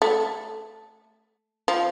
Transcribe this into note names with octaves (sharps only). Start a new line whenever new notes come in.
A3
F3